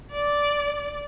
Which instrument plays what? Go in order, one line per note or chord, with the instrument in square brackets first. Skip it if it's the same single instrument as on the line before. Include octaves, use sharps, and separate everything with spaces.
[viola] D5